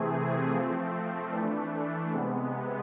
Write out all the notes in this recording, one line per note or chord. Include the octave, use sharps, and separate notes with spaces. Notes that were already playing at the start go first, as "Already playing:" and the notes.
Already playing: C3 E3 A3 C4 G#4
F3 A3 C4
E3 A3 D4
C3 G#3 B3